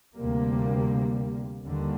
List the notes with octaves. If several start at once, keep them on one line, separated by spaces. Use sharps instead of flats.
D2 C3 G3 A#3
D#2 D3 G3